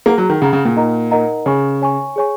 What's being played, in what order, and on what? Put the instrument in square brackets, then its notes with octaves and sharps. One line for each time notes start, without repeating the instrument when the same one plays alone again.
[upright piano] A#3 [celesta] G#4 F#5 A#5
[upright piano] F#3
D#3
[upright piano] C#3 [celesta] G#4 F#5 A#5
[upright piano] C#3
A#2
[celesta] D#4 A#4 D#5 F#5 A#5
D#4 A#4 D#5 F#5 A#5
[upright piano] C#3 [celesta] C#5 G#5 C#6
[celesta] C#5 G#5 C#6
G#4 C#5 G#5 C#6